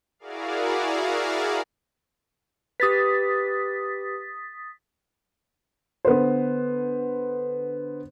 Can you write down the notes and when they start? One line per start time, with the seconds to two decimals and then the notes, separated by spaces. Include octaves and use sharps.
0.19 E4 F#4 G#4 A#4 D5 F5
2.80 G4 B4 D#6 A6 B6
6.05 D3 B3 B4 C5